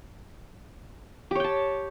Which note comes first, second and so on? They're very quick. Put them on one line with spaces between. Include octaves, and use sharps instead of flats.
G4 C#5 G5 A5